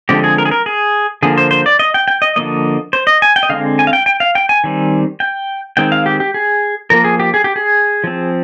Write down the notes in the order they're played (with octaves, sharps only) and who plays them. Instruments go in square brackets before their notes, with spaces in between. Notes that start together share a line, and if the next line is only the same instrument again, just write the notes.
[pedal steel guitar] D3 F3 G#3 C4 G4
G#4
A#4
G#4
A#4
G#4
D3 F3 A#3 G#4
C5
C5
D5
D#5
G5
G5
D#5
D3 F3 A#3 D#5
C5
D#5
G#5
G5
D#5
D3 G#3 C4 F5
G#5
F5
G5
G5
F5
G5
G#5
D#3 G3 C4
G5
D#3 G#3 C4 G5
F5
G4
G4
G#4
F3 A#3 A#4
G#4
G4
G#4
G4
G#4
F3 C4